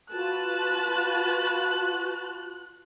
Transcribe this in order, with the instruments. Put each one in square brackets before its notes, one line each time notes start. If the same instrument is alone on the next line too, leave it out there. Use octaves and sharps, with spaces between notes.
[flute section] F4 F#4 [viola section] B4 A5 [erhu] F#6